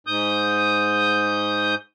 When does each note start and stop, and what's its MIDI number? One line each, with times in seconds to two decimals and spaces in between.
0.07 1.75 44
0.07 1.75 87
0.07 1.75 91